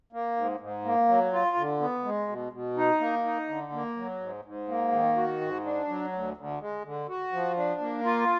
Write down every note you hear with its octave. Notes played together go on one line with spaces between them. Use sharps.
A#3
G#2
G#2
A#3
F#3
F4
D3
B3
G#3
B2
B2
D#4
A#3
D#4
D3
A#3
F#3
G#2
G#2
A#3
D#3
F#4
G#2
D4
F#3
D2
D2
G#3
D3
F#4
F3
D4
A#3
F4